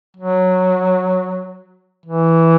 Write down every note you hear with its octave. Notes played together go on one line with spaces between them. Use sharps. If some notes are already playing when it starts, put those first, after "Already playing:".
F#3
E3